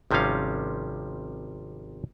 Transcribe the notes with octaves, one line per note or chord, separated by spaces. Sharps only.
G#1 C3 F3 G3 C#4 F5